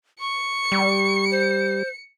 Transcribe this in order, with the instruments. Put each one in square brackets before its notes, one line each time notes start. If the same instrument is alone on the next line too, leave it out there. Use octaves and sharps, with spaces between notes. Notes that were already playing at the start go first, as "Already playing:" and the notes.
[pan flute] C#6 [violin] C#7
[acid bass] G3
[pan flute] C5